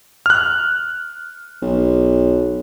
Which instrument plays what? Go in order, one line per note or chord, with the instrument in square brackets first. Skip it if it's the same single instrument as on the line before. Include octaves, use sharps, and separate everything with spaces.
[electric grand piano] F6 F#6
[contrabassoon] B1